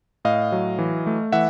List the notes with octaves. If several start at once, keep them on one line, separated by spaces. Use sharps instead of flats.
A2 D#5 F5
F#3
E3
A3
E3 E5 F#5